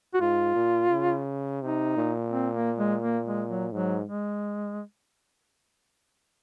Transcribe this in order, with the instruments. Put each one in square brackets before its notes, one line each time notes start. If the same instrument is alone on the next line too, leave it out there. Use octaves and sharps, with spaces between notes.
[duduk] F#4
[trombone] G#2 [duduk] F4
[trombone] A#2
C#3
[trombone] C3 [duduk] D#4
[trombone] A#2
[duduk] C4
A#3
G#3
A#3
G#3
F#3
[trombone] G#2 [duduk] F#3
[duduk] G#3